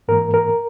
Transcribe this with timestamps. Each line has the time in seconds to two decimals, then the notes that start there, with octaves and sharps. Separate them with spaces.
0.08 G#2 E3 A#3 A#4
0.34 A#4